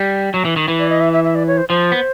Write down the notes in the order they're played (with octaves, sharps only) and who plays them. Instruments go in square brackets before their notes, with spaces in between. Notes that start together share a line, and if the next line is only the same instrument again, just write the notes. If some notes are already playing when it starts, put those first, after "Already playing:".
Already playing: [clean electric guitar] G3
F#3
E3
D#3
E3
[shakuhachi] D5
D#5
E5
E5
E5
D5
C#5
C5
[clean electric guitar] F3 [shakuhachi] C5
[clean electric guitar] B3